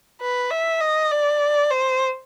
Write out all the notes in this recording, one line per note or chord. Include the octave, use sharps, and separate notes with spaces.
B4
E5
D#5
D5
C5